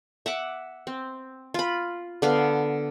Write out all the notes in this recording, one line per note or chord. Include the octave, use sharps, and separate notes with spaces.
E5 F#5 D6
C4
F4 B5
D3 B3 F5